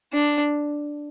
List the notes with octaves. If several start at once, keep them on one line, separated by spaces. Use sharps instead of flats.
D4